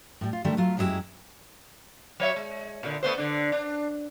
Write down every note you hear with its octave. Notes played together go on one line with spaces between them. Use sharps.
A2 G3
F4
D3 D#3 G3 A3 G4
F#3 A3 F4
F#2 F#3 G#3 B3 E4 G4
F#3 C#5 E5
G#3
A#2 D3
A3 B3 C5
D3 D4
D4